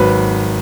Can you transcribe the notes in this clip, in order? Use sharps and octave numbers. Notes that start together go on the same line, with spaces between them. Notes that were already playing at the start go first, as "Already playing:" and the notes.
Already playing: G#1 F#3 B4